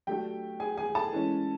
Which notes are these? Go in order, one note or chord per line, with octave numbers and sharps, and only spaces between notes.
F#3 A3 D4 G4 G5
G#4 G#5
G#4 G#5
A4 A5
E3 G#3 C#4